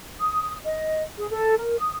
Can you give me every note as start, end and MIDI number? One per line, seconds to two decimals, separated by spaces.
0.18 0.54 87
0.65 1.03 75
1.18 1.27 68
1.30 1.57 69
1.58 1.76 70
1.79 1.94 87